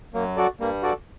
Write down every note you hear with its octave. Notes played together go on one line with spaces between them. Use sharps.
F#2 F#3 A#3
F#4 A4 D5
G2 G3 A#3
F#4 A4 D5